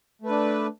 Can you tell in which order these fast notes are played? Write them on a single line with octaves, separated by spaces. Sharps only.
A3 B4 D4